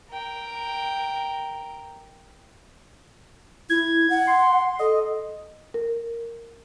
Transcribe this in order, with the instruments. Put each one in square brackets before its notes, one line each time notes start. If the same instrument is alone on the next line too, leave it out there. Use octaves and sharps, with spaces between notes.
[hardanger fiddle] A#4 G5
[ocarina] E4 [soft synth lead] G#6
[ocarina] F#5
[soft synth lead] C6
[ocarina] A4 [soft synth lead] D#5
[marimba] A#4